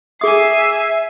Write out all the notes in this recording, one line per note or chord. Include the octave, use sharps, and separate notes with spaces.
G#4 E5 G#5 D#6 C7